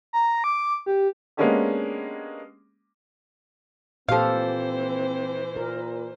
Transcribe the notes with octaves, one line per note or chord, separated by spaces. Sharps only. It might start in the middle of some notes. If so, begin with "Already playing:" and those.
A#5
D6
G4
G#3 A#3 B3 C#4 D4 G4
A#2 E3 F3 C4 G4 A4 C5 F5
A#2 A#4